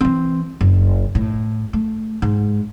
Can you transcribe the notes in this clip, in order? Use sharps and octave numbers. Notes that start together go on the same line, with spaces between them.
E3 C4
F#1
A2
A3
G#2